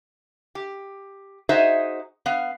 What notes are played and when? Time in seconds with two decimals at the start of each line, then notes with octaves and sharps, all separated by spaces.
0.55 G4
1.49 D#4 F#4 G#4 C5 D#5 E5
2.26 B3 F5